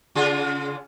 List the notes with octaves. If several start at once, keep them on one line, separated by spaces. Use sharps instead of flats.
C#3 F4 G#4